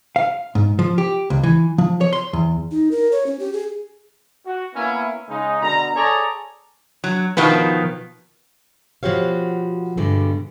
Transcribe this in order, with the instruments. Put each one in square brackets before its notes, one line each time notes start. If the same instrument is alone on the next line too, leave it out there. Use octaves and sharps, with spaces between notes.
[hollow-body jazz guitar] F5
G#2
F3
G4
C#2
E3
F3
C#5
C6
E2
[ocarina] D#4
A#4
C#5
C#4
G4
G#4
[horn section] F#4
A#3 B3 C#4 E4
C#3 G#3 D#4
B2 D3 A#5
G#4 A4 C#5 D5 A#5
[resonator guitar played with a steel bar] F#3
B2 D#3 F3 B3
[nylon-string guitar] B2 F3 F#4 G4 C#5 F5
G2 B2 D3 G#3